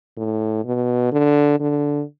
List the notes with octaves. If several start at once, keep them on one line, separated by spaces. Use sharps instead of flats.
A2
B2
D3
D3